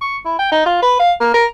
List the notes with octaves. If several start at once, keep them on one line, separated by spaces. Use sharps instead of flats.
C#6
E4
G5
D#4
F4
B4
F5
A#3
A#4